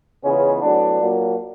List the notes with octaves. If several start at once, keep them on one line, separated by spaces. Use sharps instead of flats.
C#2 C#3 E3 G#3 B3 C#4
A2 F#3 B3 D4
A#2 F#3 A#3